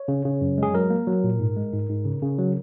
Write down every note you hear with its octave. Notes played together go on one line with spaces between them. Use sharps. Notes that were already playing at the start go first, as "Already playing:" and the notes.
Already playing: C#5
C#3
C#3
F#2
G#3 G#4
F#3 A#4
A#3
F#3
A#2
G#2
G#3
G#2
G#2
C#3
C#3
F#3